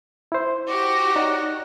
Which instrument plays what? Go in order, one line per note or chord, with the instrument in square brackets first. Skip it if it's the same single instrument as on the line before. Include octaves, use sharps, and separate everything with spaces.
[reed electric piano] E4 C5
[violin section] F#4 G4 A#6 [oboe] D6
[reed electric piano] D#4 C#5 D5 [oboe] F#5